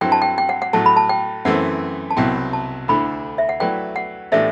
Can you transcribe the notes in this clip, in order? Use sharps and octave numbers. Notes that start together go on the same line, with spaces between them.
G2 F#3 C4 E4 A4 G5
A5
G5
G5
F#5
F#5
A2 F#3 A3 A5
B5
A5
G5
F#2 E3 A3 C4 F#5
A5
C2 B2 F#3 C4 E4 G5
A5
D2 D3 A3 E4 B5
E5
F#5
F#3 A3 E4 B4 D5 G5
F#5
A2 E3 A3 D4 G4 E5